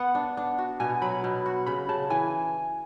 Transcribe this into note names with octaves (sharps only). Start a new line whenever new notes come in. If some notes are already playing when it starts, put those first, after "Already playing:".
Already playing: B3 F#5
D4
D4
F#4
B2 G#5
F#3 B5
B2
F#4
C#3 B5
C#3 A5
E3 G#5